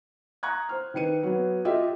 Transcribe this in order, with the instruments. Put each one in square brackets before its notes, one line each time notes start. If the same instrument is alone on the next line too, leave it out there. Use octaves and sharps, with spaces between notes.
[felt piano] A#5 C#6 D#6 F#6 G#6
C5 F6
D#3 B4 C#7 D#7
F#3 B3
F4 G4 A4 D#5 E5